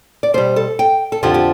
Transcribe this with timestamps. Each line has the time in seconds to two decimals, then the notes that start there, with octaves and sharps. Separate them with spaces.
0.23 D5
0.34 B2 G3 C5
0.56 A4
0.79 G5
1.12 A4
1.23 F2 D3 F3 G4
1.34 G4